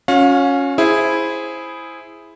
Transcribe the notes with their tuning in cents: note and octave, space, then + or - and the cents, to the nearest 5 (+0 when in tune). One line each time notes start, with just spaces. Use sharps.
C#4 +0 F#4 -40 F5 +35
E4 +0 G#4 +0 C5 +0